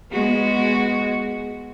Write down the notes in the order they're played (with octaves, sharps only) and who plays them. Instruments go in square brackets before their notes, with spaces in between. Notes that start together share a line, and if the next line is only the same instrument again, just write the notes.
[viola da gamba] G#3 B3 F#4